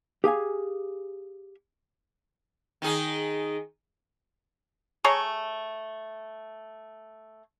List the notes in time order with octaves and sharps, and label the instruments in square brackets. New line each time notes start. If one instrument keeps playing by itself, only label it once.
[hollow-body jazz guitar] G4 G#4 F5 G#5
[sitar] D#3 D#4 G#4
[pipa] A3 G#4 C#5 A#5